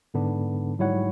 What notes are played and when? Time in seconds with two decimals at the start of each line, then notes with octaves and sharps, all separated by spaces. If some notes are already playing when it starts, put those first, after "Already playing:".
0.14 G#2 D3 B3 D4
0.79 G#2 F#3 G3 E4 C#5 F#5